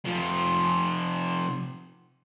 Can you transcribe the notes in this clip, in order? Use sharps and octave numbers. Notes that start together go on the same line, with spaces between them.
C3 F3